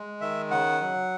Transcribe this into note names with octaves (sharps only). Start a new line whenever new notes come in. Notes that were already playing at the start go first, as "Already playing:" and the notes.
Already playing: G#3
D#3 E5
C#3 F#5
F#3